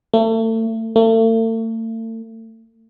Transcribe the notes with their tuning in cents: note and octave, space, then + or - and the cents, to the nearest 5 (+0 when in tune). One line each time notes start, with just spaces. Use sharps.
A3 +35
A3 +40